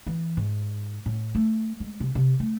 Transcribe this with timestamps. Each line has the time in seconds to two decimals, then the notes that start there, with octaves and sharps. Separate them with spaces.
0.07 E3
0.37 G#2
1.06 A2
1.35 A3
1.80 G#3
2.00 C3
2.15 C3
2.40 A3